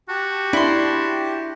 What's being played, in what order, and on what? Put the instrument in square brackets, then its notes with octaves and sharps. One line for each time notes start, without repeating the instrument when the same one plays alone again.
[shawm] F#4 [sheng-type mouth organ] G4 A5
[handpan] D4 [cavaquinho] E4 C6